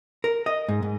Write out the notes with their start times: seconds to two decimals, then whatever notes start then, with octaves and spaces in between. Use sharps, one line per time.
0.24 A#4
0.46 D#5
0.69 G#2
0.82 G#2